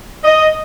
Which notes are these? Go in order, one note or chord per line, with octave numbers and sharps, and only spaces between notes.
D#5